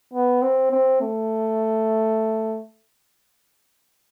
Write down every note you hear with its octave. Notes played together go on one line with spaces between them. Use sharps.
B3
C4
C4
A3